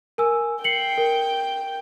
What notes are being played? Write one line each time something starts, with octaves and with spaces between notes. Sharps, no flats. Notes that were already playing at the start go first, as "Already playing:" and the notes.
A#4 G#5 E6
G5 C7 C#7 F#7
A#4